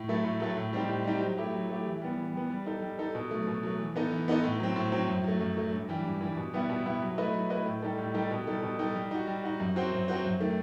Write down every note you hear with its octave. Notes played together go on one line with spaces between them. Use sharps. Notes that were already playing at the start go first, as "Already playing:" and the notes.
Already playing: A2
F#3 A3 E4 A4
A2
F#3 A3 E4 A4
A2
G3 C4 D#4 G4
A2
G3 C4 D#4 G4
F#3
A3 E4 G4
F#3
A3 E4 G4
E3
G3 B3
E3
G3 B3
G3
D#4 A4
G3
D#4 A4
B2
F#3 A3
B2
F#3 A3
E3
B3 D#4 A4 D#5
E3
B3 D#4 A4 D#5
A2
F#3 C4
A2
F#3 C4
F#2
F#3 A3
F#2
F#3 A3
G2
E3 G3
G2
E3 G3
B2
G3 B3 E4
B2
G3 B3 E4
F#3
A3 E4 B4 D#5
F#3
A3 E4 B4 D#5
A2
G3 D#4 A4
A2
G3 D#4 A4
B2
G3 D#4 A4
B2
G3 D#4 A4
G3
D#4 F#4
G3
D#4 F#4
F#2
F#3 C4 F#4 C5
F#2
F#3 C4 F#4 C5
F#2
D#3 A3